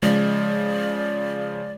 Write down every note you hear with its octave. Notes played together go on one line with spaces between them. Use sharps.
C#3 F3 G#3 D5